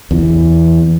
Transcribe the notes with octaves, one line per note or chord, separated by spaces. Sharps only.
E2